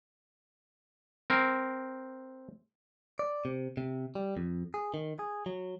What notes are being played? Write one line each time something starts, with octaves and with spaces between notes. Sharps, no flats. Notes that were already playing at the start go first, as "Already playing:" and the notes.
C4 A#4
D5
C3
C3
G3
F2
G#4
D#3
G#4
F#3